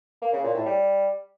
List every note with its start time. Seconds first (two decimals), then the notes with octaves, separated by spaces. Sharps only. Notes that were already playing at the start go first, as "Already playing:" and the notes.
0.22 A#3
0.33 C#3
0.44 A#2
0.55 A2
0.66 G3